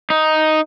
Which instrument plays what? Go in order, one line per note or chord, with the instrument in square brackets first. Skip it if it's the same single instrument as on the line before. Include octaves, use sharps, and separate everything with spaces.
[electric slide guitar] D#4